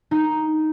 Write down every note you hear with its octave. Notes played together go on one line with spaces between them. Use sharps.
D#4